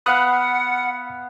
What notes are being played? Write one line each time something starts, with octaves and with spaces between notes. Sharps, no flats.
B3 F5 F#5 B5 D#6 F#6